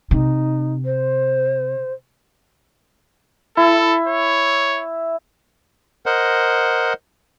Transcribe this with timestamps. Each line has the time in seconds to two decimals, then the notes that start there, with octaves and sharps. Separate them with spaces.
0.11 C3 D#4
0.85 C5
3.57 E4 A4
4.07 C#5
6.06 A#4 C5 D#5 F#5